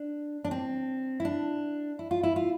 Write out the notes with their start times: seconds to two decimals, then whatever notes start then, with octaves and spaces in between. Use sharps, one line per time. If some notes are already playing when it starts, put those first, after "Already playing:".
Already playing: D4
0.45 D4
0.51 C4
1.20 E4
1.25 D4
1.99 E4
2.11 F4
2.23 E4
2.36 F4